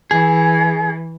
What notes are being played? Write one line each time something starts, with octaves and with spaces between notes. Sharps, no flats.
E3 G#4